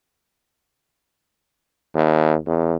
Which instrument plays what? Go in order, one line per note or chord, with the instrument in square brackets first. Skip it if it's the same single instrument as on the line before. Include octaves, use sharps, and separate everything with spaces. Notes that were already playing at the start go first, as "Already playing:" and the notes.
[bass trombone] D#2
E2